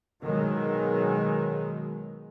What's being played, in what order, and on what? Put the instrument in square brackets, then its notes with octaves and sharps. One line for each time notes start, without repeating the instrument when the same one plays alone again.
[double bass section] B2 D#3 F#3 G#3